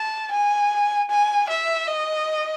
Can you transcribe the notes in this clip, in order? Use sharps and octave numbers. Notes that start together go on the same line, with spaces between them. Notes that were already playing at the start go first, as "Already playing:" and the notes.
Already playing: A5
G#5
G#5
E5
D#5